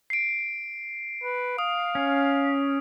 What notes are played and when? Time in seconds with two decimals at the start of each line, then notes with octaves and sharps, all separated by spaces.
0.10 C7 D7
1.24 B4
1.58 F5 D#6
1.95 C#4